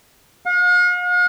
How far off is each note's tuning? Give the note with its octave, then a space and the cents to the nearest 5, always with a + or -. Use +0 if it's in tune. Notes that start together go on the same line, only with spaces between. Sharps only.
F5 +45